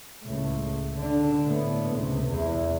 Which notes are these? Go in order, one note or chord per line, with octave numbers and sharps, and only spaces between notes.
C#2 A2
D3 D4
A2 B3
C#2 C3
E2